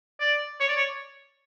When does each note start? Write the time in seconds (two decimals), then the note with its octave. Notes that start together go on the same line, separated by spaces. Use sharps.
0.20 D5
0.60 C#5
0.68 D5
0.77 C#5